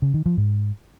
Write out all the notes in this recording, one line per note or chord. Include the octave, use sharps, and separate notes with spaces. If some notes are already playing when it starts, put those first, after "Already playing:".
C#3
D#3
F3
G#2